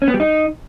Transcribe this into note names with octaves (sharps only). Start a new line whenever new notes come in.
C#4
B3
G3
D#4